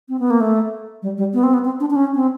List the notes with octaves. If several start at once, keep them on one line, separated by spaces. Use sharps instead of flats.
C4
B3
A#3
A3
G3
G3
B3
C4
B3
C4
D4
D4
C#4
C4